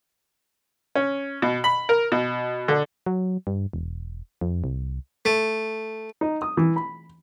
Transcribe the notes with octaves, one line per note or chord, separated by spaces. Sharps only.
C#4
B2
B5
A#4
B2
D3
F#3
G2
E1
F2
C2
A3
D#4
D#6
E3
B5